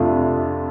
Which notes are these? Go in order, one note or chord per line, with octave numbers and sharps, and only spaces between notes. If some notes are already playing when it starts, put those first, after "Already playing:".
Already playing: F2 C3 A3 D4 F4